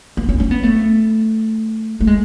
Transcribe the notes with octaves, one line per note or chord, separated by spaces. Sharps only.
B3
C#4
C#4
B3
A3
A3
G#3